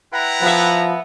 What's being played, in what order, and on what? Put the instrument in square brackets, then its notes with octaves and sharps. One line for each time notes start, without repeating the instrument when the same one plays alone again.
[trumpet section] E4 A#5 [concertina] B4 F#5 G5
[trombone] F3 [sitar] B3 E5